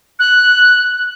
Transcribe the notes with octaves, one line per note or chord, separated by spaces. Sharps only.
F#6